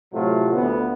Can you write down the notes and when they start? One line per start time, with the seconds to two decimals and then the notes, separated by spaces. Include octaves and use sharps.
0.12 A2 C3 F#3 A3 F4
0.53 D2 D3 B3